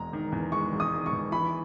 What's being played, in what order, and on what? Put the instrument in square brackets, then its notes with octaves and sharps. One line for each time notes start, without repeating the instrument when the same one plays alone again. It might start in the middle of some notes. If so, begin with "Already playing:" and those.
Already playing: [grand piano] E1 G#3 [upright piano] A#5
[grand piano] D#3
E2
[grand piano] G#3 [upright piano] C#6
[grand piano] E1
[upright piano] D#6
[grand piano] D#3
[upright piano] C#6
[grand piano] E2
[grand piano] E3 [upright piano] B5